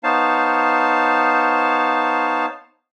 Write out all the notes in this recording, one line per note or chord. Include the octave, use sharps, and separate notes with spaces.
B3 D#4 C5 C#5 F5 A5